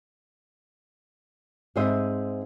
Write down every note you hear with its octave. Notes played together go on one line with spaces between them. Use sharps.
G#2 C4 G#4 C5 D#5 E5